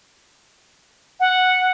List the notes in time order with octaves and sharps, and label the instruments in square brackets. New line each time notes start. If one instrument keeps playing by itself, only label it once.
[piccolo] F#5